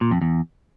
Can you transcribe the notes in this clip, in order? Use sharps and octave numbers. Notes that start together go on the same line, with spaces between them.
A#2
F2
E2